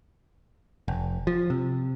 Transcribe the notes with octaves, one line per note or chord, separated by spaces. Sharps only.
F1
F3
C3